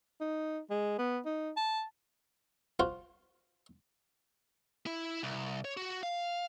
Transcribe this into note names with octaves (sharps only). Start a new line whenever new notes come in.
D#4
G#3
B3
D#4
A5
F4 F#4 C5
E4
C2
C#5
F#4
F5